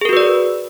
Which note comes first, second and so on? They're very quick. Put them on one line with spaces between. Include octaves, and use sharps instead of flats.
G#4 A#4 F#4 B4 D5